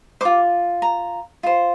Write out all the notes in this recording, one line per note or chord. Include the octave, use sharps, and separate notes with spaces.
F4 C5 D6
A#5
F4 C5